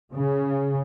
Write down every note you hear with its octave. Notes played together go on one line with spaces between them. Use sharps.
C#3